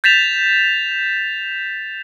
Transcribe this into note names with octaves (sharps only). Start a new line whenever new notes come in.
G6 A6 B6 E7 F7